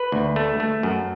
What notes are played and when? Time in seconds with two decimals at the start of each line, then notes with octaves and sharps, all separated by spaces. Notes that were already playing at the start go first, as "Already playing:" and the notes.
Already playing: B4
0.12 D2
0.36 A3
0.60 A3
0.83 F#2